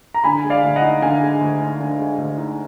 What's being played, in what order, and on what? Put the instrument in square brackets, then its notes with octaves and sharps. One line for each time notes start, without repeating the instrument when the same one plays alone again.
[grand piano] A#5
[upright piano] D3 [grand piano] G#5 B5
[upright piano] G#3
[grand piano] D5 F5
[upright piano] D2
[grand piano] D#5 F#5
[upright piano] D#4
[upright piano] D3 [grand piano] F5 G#5
[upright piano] G#3
D2
D#4
D3
G#3
D2
D#4